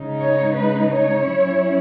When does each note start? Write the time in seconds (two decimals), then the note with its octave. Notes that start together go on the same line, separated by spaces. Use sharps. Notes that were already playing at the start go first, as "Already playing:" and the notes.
Already playing: C#3 G#3 D#4
0.21 C#5
0.56 B4
0.91 C#5
1.26 F#3 C#4 E4